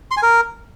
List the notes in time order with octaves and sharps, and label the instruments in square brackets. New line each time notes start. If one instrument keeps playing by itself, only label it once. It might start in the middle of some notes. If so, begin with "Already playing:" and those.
[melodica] C6
G#5
A#4